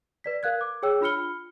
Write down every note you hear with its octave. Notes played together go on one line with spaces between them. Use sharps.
B4 D5 B6
A#4 F5 F#6 G#6
D6
G#4 C#5 G5 E6
D4 F4 B5 F6 C#7 G7